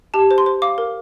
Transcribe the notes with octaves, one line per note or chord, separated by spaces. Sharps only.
G4 A5
C5
C6
C5
F5 D6
A#4